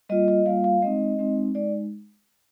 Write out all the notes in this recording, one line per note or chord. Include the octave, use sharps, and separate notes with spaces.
G3 A#3 F4 D#5
D#5
G3 A#3 F4 F5
F5
G#3 C4 D#4 D#5
G#3 C4 D#4
G#3 D#4 D5